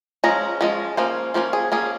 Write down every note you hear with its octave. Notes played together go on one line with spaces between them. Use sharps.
F3 G#3 C#4 A#5
F3 G#3 C#4
F3 A#3 C#4 C5
F3 A#3 C#4 C5
G#4
F3 A#3 C#4 G#4